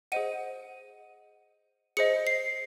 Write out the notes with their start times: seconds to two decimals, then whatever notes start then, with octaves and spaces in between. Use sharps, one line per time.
0.12 G#4 C5 D#5 F#5 D#7
1.97 G#4 C5 D#5 C#7
2.27 C7